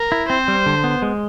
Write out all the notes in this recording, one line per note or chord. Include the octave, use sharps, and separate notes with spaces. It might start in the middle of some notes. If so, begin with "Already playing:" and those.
Already playing: A#4
E4
C4 C5
G3
D3
B3
G#3